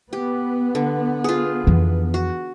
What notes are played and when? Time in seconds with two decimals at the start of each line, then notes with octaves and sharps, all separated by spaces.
0.13 B3 G4
0.75 D3
1.24 F4 G#4
1.67 F2 E3
2.14 F#4